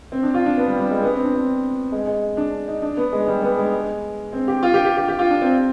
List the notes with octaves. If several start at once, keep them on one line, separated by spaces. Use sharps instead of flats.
C4
D4
F4
D4
B3
G3
G3
G#3
B3
C4
D4
C4
G#3
G#3
D4
D#4
D4
B3
G#3
G3
B3
G#3
C4
G4
F4
G4
G4
G4
G4
F4
D4
C4